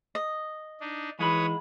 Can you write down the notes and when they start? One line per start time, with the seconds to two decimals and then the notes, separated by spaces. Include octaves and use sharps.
0.15 D#5
0.81 D4 D#4
1.19 G#2 E3 G#3 B4 C#5 B5 D#6